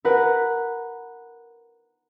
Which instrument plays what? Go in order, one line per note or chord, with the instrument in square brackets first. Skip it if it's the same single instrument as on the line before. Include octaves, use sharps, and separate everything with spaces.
[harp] A#4 B4 F#5